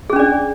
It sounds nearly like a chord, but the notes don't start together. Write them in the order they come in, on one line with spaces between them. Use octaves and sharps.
G#4 C#4 D4 D5